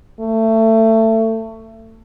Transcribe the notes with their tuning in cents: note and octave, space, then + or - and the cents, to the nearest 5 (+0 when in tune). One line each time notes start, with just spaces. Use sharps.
A3 +25